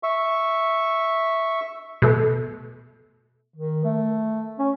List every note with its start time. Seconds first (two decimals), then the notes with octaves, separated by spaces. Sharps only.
0.03 E5 C#6
2.02 B2 A3
3.56 D#3
3.84 A3
4.59 C#4